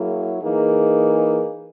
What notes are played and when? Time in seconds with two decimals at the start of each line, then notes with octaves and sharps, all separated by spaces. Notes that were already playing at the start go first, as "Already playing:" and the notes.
Already playing: F#3 A#3 E4 G#4
0.42 E3 A#3 D#4 G#4